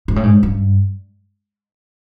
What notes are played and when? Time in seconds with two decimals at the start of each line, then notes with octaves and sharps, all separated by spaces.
0.08 G#2
0.16 A2
0.23 G#2
0.43 G2